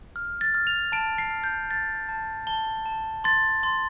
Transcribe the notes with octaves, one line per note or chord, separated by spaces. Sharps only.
F6
A6
F6
F7
A5 D7
C7
F6
G6
F6 A6
A5
A5 G7
A5
C6 A6
C6